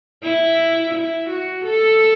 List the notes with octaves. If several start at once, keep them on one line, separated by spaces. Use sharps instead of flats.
E4
E4
F#4
A4